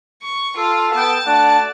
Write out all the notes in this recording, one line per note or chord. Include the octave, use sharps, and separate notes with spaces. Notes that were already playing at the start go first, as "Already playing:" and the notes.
C#6
F4 A4
B3 G5 A5
A3 D4 F#4 D5 F#5